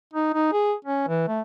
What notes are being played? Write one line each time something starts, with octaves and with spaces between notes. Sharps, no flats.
D#4
D#4
G#4
C#4
E3
A3